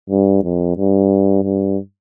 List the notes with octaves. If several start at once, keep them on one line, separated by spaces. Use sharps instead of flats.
G2
F2
G2
G2